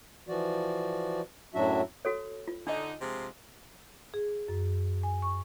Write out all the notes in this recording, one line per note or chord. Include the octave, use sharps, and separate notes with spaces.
E3 F3 F#4 D5
F#2 A2 F#3 D4 F#4 E5
F#4 A4 C#5
F4
D3 D4 D#4 D#5
C3 F3 G#3
G#4
F#2
G#5
C#6